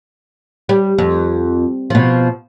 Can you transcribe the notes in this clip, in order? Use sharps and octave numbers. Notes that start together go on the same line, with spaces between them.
G3
F2
B2 F3